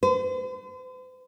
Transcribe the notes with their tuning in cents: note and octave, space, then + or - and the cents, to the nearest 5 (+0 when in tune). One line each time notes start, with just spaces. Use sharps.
C5 -45